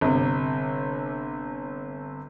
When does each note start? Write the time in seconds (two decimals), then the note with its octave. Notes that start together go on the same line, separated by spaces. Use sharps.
0.01 G1 C3